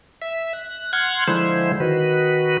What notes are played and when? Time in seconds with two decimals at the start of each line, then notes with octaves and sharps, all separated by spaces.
0.22 E5
0.53 F#6
0.93 F#5 C6 F6 F#6 G#6
1.28 D3 F3 G#3 E4 C5
1.80 D#3 F#4 B4